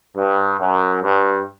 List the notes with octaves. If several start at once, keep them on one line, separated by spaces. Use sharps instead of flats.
G2
F#2
G2